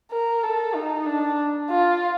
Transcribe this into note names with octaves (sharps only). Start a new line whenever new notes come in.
A#4
A4
D#4
D4
F4